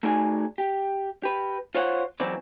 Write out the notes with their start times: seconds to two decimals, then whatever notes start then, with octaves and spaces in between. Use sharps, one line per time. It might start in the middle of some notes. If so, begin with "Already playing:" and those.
0.03 A3 D#4 F#4 G#4 D5 G#5
0.58 G4
1.23 G4 B4
1.75 F4 C5 C#5 F5 F#5
2.20 E3 F#3 C4 F#4 B4 D5